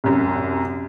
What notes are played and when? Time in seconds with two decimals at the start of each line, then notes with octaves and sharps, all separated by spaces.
0.04 C2 F#2